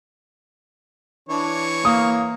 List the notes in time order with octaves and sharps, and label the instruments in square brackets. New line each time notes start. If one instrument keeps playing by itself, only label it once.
[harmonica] E3 C#5 C#6 [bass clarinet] D4
[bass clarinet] A#3 [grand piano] D#6